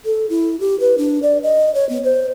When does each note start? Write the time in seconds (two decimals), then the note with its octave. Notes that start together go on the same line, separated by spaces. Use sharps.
0.05 A4
0.30 E4
0.60 G4
0.80 B4
0.98 D4
1.23 D5
1.43 D#5
1.75 C#5
1.89 B3
2.04 C5